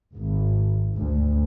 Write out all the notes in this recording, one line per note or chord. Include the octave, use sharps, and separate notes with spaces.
G#1
D2